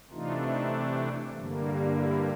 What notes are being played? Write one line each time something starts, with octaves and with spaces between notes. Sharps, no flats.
C3 E3 A3 D4 D#4 F4
D#4
G2 D3 G3 A#3
E4